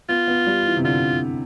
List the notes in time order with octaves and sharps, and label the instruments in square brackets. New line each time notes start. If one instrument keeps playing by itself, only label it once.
[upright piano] B3 [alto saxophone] F4
[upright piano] B3
G3
E3
C3
[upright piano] D3 [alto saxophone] F4